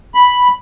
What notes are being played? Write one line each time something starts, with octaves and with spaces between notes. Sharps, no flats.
B5